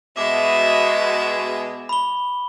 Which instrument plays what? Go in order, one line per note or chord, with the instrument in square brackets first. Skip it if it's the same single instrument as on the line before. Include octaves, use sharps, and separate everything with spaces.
[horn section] B2 G#3 [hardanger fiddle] E5 [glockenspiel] D6
[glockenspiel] B5 G7